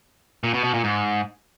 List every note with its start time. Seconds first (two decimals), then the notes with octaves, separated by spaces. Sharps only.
0.44 A#2
0.54 B2
0.64 B2
0.74 A#2
0.84 G#2